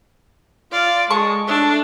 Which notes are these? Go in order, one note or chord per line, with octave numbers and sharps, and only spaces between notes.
F4 D5 C6 F6
G#3 G#4 A5 C#6 D#6
A3 D4 E6